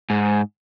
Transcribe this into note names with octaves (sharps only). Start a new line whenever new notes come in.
G#2